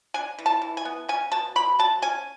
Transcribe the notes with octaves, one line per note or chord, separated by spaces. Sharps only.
D4 G#5
E3
A5
E3
G#5
B3
C#4 G#5
B2 A5
B2 B5
F#3 A5
C#4 G#5